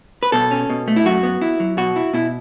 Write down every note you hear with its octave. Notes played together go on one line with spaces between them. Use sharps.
B4
B2 A4
C#4
B2
A3
E4
F#2 F#4
B3
E4
F#3
B2 F#4
E4
B2 E4